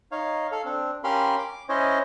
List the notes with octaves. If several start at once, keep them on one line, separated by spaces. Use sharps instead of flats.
D#4 C#5 F5
A4 F5
C4 D4
C#4 G4 A#4 F5 B5 C6
D6
C#4 E4 C5 C#5 D#5